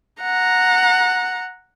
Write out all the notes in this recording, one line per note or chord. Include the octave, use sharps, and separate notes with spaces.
F#5 A#5